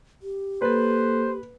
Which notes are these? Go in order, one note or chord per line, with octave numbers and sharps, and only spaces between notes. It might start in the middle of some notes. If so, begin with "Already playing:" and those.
G4
A#3 A4 B4 C5